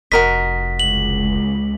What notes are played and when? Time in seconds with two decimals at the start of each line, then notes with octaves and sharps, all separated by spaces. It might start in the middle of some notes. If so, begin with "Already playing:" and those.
0.12 F1 F#4 A#4 D#5 B6
0.80 C#2 F#7